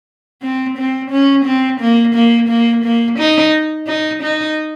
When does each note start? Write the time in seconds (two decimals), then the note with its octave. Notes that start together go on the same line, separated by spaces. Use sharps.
0.42 C4
0.77 C4
1.11 C#4
1.45 C4
1.80 A#3
2.15 A#3
2.49 A#3
2.84 A#3
3.19 D#4
3.87 D#4
4.22 D#4